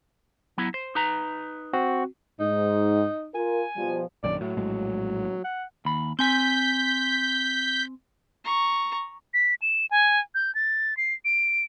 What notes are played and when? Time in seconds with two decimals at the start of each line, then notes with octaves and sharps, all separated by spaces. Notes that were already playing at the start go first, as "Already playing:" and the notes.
0.58 F#3 B3 E4
0.74 C5
0.95 D#4 B4 A#5
1.73 C4 F#4
2.40 G#2 D#4
3.35 F4 A#4 G#5
3.76 B2 F3 G3
4.24 A#1 F#2 D#3 D5
4.41 A2 F#3
4.57 A#1 A2 G#3
5.44 F#5
5.85 D#2 B5
6.19 C4 G#5 G6 B6
8.44 A#5 C#6
9.34 B6
9.62 E7
9.91 G#5
10.35 G6
10.55 A6
10.97 C7
11.25 D7